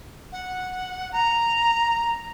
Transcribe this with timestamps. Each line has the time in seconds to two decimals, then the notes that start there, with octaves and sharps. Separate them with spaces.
0.32 F#5
1.12 A#5